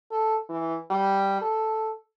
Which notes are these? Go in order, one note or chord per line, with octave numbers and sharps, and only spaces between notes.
A4
E3
G3
A4